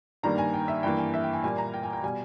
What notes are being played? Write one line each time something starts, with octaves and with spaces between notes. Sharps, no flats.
G2 D#3 G3 A#3 A#5
G#5
G5
E5
G2 E3 A#3 G5
G#5
E5
G5
G#5
A#2 G3 A#3 G#5
A#5
G5
G#5
G5
B2 G3 G#5